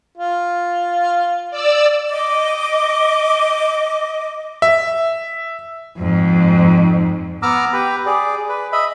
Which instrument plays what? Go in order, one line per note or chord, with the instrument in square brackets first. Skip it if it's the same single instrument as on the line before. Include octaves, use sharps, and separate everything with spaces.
[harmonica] F4
[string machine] D5 E6
[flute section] D#5 D6
[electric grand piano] E5
[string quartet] F2 G#2
[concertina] B3 A#5 D6 E6 F6
G4 B4
G#4 D5
B4
D#5 E5 B5